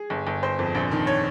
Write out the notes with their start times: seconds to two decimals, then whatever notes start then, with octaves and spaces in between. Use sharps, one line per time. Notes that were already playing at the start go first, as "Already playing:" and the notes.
Already playing: G#4
0.10 G1
0.27 G1
0.43 G1 C5
0.59 F2
0.75 A#1
0.91 D#3
1.07 C#5